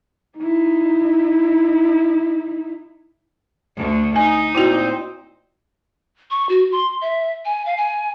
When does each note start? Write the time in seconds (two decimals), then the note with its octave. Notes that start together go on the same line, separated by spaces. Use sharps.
0.38 D#4 E4
3.77 D2 D3
4.16 D#4 G#5
4.55 A#2 C4 E4 F#4 C5
6.31 C#6
6.49 F#4
6.72 C6
7.01 E5
7.45 G#5
7.66 F5
7.77 G#5